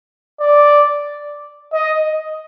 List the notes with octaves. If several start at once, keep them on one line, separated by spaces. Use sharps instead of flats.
D5
D#5